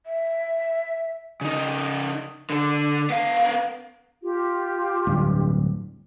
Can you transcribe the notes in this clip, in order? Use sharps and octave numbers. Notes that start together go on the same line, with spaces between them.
E5
C#3 D#4
D3 A4
B3 F5
F4 G4
D1 G2